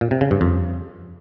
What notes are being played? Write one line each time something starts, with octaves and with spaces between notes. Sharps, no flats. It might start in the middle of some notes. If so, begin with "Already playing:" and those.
A#2
C3
C#3
G2
F2